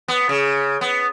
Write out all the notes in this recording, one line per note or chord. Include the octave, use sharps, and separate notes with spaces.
B3
C#3
B3